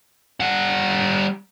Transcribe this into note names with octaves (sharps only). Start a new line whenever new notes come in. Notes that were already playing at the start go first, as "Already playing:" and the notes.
G3 F#5